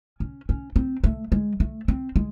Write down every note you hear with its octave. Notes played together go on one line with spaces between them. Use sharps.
C#4
C#4
C4
A3
G#3
A3
C4
G#3